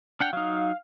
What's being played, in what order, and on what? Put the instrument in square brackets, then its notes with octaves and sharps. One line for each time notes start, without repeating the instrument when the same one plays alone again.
[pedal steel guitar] D4 F#5 G5 [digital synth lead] F6
[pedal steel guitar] F#3 D#4 [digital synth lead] F5